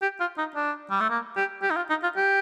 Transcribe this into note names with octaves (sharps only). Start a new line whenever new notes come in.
G4
F4
D#4
D4
G3
A3
A#3
G4
G4
D#4
F4
D#4
F4
G4